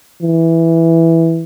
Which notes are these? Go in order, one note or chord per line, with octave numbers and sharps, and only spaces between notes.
E3